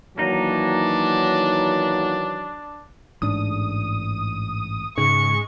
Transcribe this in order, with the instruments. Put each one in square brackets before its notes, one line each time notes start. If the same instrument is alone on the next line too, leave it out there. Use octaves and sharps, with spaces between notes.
[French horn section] D#3 E3 F#3 [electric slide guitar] A#3 D#4 [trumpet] D4
[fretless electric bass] A1 G#2 D4 [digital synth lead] D#6
[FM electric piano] G#2 [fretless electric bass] C#3 [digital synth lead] G#3 [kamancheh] C#6